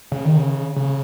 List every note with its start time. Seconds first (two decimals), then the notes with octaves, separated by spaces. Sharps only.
0.12 C#3
0.25 D#3
0.38 C#3
0.76 C#3